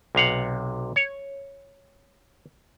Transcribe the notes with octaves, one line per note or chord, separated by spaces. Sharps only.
B1 C3 F5 F#5
C#5